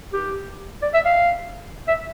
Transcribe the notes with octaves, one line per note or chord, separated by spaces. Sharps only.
G4
D5
E5
F5
E5